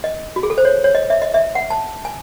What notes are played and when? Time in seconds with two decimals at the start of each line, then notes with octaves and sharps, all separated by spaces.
0.04 D#5
0.36 F#4
0.43 G#4
0.50 A4
0.58 C5
0.65 C#5
0.84 C#5
0.95 D#5
1.10 E5
1.22 D#5
1.34 E5
1.55 F#5
1.70 A5
2.05 G#5